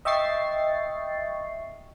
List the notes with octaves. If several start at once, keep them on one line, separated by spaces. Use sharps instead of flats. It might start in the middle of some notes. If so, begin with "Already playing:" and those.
D#5 E5 G5 C#6 A6 C7